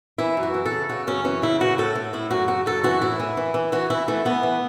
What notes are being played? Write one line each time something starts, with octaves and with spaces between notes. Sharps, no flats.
E3 E4
F#2
F#4
E3
A4
C#3
C#3 F#4
F#2 C#4
E3 C#4
C#3 E4
A2 F#4
A2 A4
A2
A2 E4
F#2 F#4
C#3 F#4
F#2 A4
E3 F#4
A2 E4
E3
E3
E3
E3 F#4
E3 E4
E3 A3
E3 B3
E3